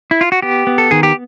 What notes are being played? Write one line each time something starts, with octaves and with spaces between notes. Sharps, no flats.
E4
F4
F#4
B3 G4
B3
A4
D#3 G#4
G4